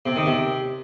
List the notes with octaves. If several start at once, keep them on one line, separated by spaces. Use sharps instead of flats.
C3
D#3
C3